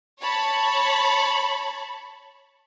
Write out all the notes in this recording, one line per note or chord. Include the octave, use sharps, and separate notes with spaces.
C#5 A5 B5 C#6